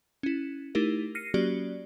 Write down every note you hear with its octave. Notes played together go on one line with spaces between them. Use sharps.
C#4 E4
A3 D#4 E4 G4 A#4
F6 A#6 C7 C#7 D#7
F#3 A#3 C#4 F#4 G4 D5